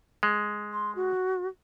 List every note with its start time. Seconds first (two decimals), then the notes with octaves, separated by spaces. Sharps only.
0.23 G#3
0.73 C6
0.96 F#4